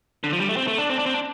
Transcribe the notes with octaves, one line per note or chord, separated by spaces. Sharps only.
D3
F3
G3
A3
C4
A3
D4
C4
D4
C4
D4